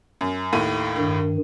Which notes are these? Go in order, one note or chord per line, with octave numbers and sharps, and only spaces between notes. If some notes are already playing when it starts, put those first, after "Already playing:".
F#2
D#2 A2 D#7
G2 D#3